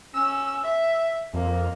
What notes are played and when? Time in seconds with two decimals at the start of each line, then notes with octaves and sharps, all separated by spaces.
0.14 C#4 E6
0.63 E5
1.34 F2 A#3